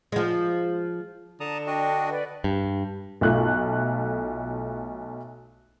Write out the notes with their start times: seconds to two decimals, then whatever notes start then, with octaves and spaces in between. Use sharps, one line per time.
0.12 F3 G#3
1.40 D3 A5 A#5 D#6
1.67 D4 F#4 D#5 G5
2.09 B4 D5 F#5
2.44 G2
3.21 B1 A3 F4 F#6